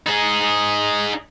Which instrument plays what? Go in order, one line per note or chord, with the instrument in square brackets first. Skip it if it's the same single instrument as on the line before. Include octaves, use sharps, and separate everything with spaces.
[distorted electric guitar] D#4 G#4